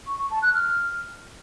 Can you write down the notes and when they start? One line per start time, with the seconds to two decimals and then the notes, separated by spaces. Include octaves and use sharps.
0.07 C#6
0.19 C#6
0.31 A5
0.42 F#6
0.54 F6